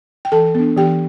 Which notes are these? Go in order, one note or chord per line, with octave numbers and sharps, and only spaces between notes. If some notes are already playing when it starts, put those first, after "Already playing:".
G5
E3 A4 A5
B3 D4
E3 G4 G5